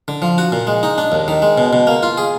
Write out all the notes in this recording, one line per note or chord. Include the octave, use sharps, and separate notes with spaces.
D3
F3
F#4
A#2
G#3
D#4
D4
D#2
D#3
G#3
B2
B2
A#3
F4
G#4